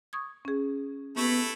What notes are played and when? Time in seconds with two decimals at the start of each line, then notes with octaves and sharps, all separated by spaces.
0.13 C#6 D#6 G#6
0.45 C#4 G#4
1.17 A3 B3 E4 G4 C#6